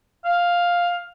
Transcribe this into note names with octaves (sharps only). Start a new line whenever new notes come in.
F5